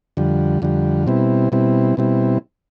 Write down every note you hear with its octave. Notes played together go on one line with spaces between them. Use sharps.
F2 D3 G3
F2 D3 G3
B2 G3 C4 E4
B2 G3 C4 E4
B2 G3 C4 E4